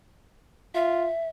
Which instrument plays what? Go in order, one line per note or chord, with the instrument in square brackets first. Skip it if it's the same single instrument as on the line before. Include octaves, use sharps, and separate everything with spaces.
[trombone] F4 [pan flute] E5